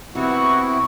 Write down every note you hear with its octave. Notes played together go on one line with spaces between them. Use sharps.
C3 B3 C4 E4 F#4 C#6